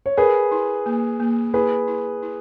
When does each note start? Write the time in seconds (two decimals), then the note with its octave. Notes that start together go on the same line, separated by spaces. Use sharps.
0.06 C#5
0.17 G#4 A#4 B4
0.52 E4
0.86 A#3
1.20 A#3
1.54 E4 G#4 B4
1.88 E4
2.23 E4